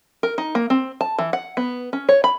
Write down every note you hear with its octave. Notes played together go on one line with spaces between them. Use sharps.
A#4
D#4
A#3
C4
A5
E3
F#5
B3
C#4
C#5
B5